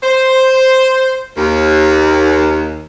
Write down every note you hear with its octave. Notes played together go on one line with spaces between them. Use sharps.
C5
D#2